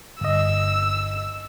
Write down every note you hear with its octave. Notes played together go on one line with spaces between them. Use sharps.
G1 D#5 E6